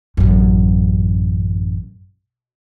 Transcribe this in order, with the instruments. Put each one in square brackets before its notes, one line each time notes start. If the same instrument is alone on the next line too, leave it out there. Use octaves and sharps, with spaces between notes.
[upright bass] A1 F#2